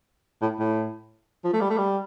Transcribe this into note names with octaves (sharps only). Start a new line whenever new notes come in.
A2
A2
F3
A3
G3
A3
G3